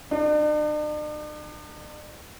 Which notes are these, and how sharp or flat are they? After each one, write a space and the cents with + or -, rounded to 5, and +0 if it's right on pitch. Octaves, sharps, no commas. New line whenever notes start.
D4 +45